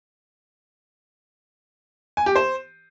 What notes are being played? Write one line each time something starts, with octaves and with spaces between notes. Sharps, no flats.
G#5
G4
C5